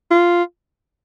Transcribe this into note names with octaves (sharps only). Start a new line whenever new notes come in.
F4